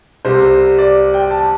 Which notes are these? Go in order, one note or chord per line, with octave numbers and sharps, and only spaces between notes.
C2 C3 G3 C5
D5
G5
A5